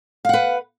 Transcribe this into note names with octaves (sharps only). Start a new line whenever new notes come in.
B4 F5 F#5